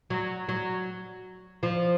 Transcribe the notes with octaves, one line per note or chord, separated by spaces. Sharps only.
F#3
F#3
F3